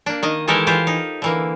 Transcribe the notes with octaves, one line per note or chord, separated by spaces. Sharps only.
A#3 D4
D#3 D#5
D#3 E3 G#3 G4 A4 A#4
E3 F4 G4 C5
D#4
D3 E3 A#3